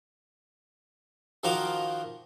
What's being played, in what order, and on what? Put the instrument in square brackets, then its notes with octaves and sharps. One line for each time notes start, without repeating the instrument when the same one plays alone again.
[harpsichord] D#3 F3 F4 F#4 A#4 D6